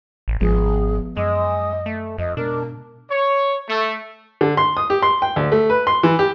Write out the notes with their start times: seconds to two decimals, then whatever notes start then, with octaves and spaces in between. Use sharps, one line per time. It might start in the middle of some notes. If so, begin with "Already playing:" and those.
0.28 A1
0.41 G#1 F3 G#3 B3 G#4
1.17 F#2 G#3 D#5 D6 E6
1.86 A3
2.18 F2 D#5
2.37 G#2 B2 D4 A#4
3.10 C#5
3.69 A3
4.41 D3
4.57 C6
4.77 D#6
4.90 G4
5.02 C6
5.22 G5
5.36 D2
5.52 A3
5.70 B4
5.87 C6
6.03 E3
6.19 G4